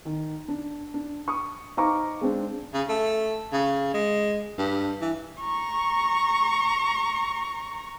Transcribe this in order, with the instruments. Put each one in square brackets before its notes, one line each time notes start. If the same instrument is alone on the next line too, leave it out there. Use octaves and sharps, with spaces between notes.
[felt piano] D#3
D4
D4
C#6 D#6
D#4 C5 F5 A#5 C#6 D6
G#3 C4 D4
[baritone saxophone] C#3
A3
C#3
G#3
G2
E3
[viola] A#5 C#6